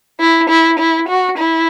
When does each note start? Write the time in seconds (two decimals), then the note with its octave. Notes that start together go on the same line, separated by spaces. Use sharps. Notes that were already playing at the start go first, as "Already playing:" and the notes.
0.20 E4
0.49 E4
0.79 E4
1.09 F#4
1.38 E4